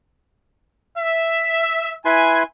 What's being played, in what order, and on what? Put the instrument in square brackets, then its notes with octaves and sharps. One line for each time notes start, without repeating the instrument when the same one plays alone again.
[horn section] E5
[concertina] E4 B4 C6 [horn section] G#5